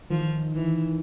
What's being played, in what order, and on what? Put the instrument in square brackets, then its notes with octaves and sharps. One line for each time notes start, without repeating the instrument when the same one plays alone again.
[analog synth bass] D#3 [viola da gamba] F3
[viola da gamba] E3